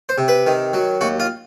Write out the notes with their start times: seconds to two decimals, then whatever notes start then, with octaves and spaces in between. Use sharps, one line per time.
0.09 C5
0.18 C3
0.28 B4
0.46 D#3
0.73 F#3
1.01 D#2 F#4
1.20 F4